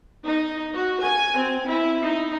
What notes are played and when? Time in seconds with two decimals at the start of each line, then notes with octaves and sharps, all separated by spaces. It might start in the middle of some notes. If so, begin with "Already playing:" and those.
0.24 D#4
0.73 F#4
1.03 G#5
1.37 C4
1.67 E4
2.05 D#4